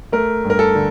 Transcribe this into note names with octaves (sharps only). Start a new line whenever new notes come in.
A3 A#4
G2
A#4
A4
D3